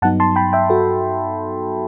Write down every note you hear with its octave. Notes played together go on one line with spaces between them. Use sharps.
G2 F#3 B3 D#4 F#5 A5
A5 C6
G5 B5
E5 G5
F#4 A4